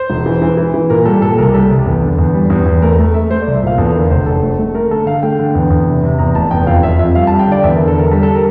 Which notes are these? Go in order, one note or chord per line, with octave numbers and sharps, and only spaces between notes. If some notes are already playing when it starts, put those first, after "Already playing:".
Already playing: C5
E1
E3
E3
E3
E3
A#2 A#4
G3 A4
A#2 A4
C2 A#4
G3 A4
C2
E2
D3
E2
G3
E2
E2
A3 A#4
A3
A3 E5
A3 C5
D5
C2
E5
A#2 F5
E2 A4
D3 A#4
F1 C5
F1 A4
A3
A3
A3 A#4
D3 A4
D3 F5
A3 G5
D3
E2
E2
C3
C3
E2 A#5
F1 A5
E2 G5
F2 F5
F2 E5
F2 E5
G3 F5
A5
G3
G5
D3 D5
E2 E5
A#4
D3
A4
D3 A#4
G3 A4
A4
A#4